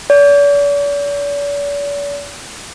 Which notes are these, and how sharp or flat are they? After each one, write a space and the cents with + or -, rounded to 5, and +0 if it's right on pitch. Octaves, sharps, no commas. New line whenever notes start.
D5 -45